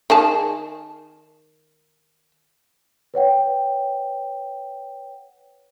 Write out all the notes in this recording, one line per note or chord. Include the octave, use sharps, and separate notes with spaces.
D#3 G#4 A5
B4 C#5 F#5 G5